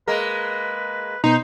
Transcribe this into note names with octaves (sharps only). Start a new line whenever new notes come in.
G#3 A#3 A#4 B4
B2 B3 D#4 C5